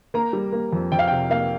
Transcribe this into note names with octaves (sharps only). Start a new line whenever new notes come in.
A#3 A#5
G3
A#3
F2
F2 G5
F5
G5
C3
A#3 F5